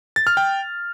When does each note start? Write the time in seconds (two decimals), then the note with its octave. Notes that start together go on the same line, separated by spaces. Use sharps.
0.16 A6
0.27 F6
0.37 G5